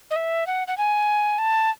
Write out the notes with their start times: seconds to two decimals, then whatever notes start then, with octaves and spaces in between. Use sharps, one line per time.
0.11 D#5
0.16 E5
0.47 F#5
0.68 F#5
0.78 G#5
1.38 A5